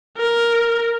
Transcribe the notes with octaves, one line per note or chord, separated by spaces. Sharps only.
A#4